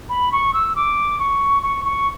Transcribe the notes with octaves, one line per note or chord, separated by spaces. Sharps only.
B5
C#6
E6
D6
C#6
C#6
C#6